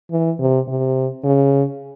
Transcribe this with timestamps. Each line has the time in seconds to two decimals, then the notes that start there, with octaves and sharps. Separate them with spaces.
0.11 E3
0.40 C3
0.68 C3
1.24 C#3